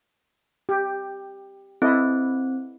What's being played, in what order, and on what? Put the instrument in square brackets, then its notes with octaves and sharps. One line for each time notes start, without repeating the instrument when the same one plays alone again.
[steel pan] G4
[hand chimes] C4 [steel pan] E4 A4 D#5